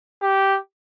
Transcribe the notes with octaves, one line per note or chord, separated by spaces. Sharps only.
G4